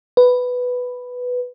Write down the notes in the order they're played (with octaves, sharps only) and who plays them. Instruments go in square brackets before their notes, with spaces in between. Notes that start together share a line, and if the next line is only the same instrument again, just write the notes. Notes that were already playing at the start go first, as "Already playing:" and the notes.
[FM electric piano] B4